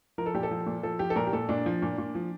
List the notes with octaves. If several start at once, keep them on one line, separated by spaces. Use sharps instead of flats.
F3 A#4
A4
A#2 G4
A4
F3
A#2
F3 A4
F3 G4
A4
A#2 A#4
G4
A#2 A4
A#2 D4
F3
A#2
A#2
F3